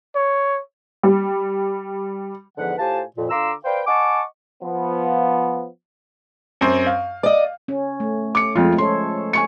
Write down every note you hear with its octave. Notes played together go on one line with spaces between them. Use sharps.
C#5
G3
E2 G#2 D3 F3 B4 F#5
A2 F4 G4 C5 G#5 A5
F2 A#2
D3 F4 A#5 C6 D6 E6
B4 C5 D5 F5 G5
D#5 F#5 G#5 A5 C#6 D6
F3 B3
F#2 C4
F5
D5 D#5
C#4
A3
D6 C#7
F2 F3 G#3 A3 F4
C#4 A4 C#5 C6
G#5 C#6 C#7